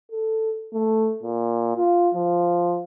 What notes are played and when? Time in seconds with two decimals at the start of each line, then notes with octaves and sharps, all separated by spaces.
0.12 A4
0.74 A3
1.23 A#2
1.76 F4
2.14 F3